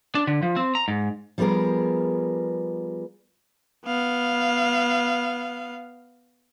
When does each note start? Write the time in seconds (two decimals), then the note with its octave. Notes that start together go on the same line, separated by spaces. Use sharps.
0.15 D4
0.27 D3
0.43 F3
0.56 C4
0.75 A#5
0.88 G#2
1.38 F3 G3 B3 G#4 A#4
3.86 B3 F5